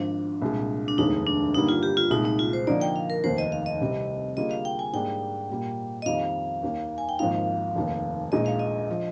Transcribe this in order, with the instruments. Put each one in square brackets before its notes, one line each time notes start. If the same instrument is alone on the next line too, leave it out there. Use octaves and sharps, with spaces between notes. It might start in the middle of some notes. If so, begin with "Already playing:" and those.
Already playing: [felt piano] G#1 G#2 F3 [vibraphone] D4
[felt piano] C2 A#2 G#3
[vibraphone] D4
[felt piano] F1 D#2 D#3 G#3 [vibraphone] D#4
[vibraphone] D4
[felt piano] G2 D3 G3 A#3 [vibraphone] D#4
[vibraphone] F4
G4
F4
[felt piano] C2 A#2 G#3 [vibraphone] D#4
[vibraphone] D#4
F4
C5
[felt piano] D3 F3 A#3 D#4 [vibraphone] D5
[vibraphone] G5
F5
A#4
[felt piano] F1 D#2 D#3 [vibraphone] C5
[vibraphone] D#5
F5
D#5
[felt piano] C2 C3 G3 C4
[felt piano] D3 G3 A#3 F4 G#4 [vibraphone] D#5
[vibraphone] F5
G5
G#5
[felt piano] G#2 G3 A#3 D4 G#4 [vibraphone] G5
[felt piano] A#2 G3 A#3
[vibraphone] D#5
[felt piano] F2 D#3 G3 A#3 D#4 [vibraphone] F5
[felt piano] D#2 D#3 A#3
[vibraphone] G#5
G5
[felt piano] G#1 G#2 F3 A#3 D#4 [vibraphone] F5
[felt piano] F1 D#2 D#3
[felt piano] A#1 A#2 G#3 D#4 [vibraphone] D#5
[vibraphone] F5
D#5
[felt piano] F3